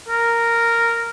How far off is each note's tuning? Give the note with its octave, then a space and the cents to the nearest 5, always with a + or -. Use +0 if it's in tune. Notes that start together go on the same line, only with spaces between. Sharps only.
A#4 -5